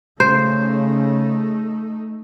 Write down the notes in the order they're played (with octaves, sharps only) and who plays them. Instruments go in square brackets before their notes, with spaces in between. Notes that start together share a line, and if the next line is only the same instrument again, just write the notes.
[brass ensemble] C#3 [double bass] A3 D#4 [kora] C5